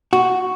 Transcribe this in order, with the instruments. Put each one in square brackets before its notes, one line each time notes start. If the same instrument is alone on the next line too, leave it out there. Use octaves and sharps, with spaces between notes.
[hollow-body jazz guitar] F#4